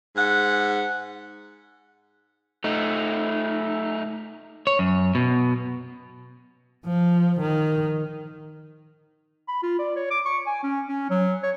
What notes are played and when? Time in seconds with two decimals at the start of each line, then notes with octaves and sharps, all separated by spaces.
0.16 G#2 F#5
2.64 A3 D#4
4.67 C#5
4.79 F#2
5.15 B2
6.85 F3
7.41 D#3
9.48 B5
9.63 F4
9.79 D5
9.96 C#5
10.11 D6
10.25 C#6
10.46 G#5
10.63 C#4
10.87 C#4
11.10 F#3
11.43 C#5